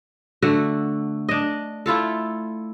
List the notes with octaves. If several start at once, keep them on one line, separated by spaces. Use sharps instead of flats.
D3 A3 F#4
D4 D#5
A3 E4 F4 A4